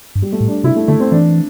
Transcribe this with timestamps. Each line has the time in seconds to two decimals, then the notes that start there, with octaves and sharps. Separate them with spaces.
0.15 G2
0.22 G3
0.32 A3
0.40 A2
0.48 D4
0.64 C3 E4
0.76 A3
0.88 D3 A3
1.00 C4
1.12 E3 D4